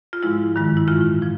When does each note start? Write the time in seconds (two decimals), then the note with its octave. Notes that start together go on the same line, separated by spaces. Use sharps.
0.13 F4
0.23 G#2 F3 G#3 E4
0.56 G2 D#3 G#3
0.77 E4
0.87 A2 E3 G#3 F4
1.22 F3